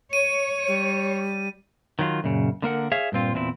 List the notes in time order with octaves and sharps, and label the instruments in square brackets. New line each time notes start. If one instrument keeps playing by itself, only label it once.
[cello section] C#5 [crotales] D#7
[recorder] G3
[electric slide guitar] D#3 F#3 E4 F4
F#2 A#2 C#3
D3 A#3 A#4 F#5
G#4 C#5 E5 F5
G2 A#2 C4 F4
E2 A#2 C4 D4 E4